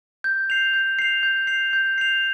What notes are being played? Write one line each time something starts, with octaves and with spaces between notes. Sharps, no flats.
G6
C7 F7
G6
C7 F7
G6
C7 F7
G6
C7 F7